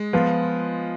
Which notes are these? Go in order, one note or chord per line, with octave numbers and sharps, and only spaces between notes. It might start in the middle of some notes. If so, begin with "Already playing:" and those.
Already playing: G#3
F3 B3 F4